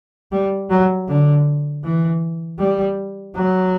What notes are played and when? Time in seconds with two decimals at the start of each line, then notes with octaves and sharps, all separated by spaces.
0.32 G3
0.70 F#3
1.08 D3
1.84 E3
2.59 G3
3.35 F#3